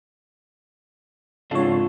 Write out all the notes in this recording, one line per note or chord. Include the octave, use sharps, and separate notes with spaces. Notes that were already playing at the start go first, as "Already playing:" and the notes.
F2 G#2 C#3 D4 F4 A4 C#5